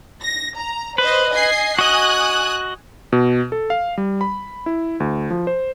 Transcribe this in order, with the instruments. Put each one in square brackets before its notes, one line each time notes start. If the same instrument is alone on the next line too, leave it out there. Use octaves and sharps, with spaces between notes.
[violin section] A#6
A#5
[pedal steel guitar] B4 [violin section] C5 D#5
[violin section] D#5 G#5 C7
[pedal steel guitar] F#4 D#5 [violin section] G#5 D#6 F#6
[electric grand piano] B2
A4
F5
G3
B5
E4
D2
F3
C5